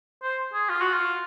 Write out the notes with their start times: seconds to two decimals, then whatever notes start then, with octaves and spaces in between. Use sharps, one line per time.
0.23 C5
0.53 G#4
0.69 F4
0.81 F#4
0.93 F4